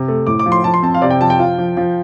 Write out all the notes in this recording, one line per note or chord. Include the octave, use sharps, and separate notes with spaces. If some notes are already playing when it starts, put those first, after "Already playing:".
Already playing: C3
A3
A2 D6
D6
F3
C6
F3 A5
C6
C4 A5
F5
C3 D5
G5
F3 A5
G5
F4
F3
F3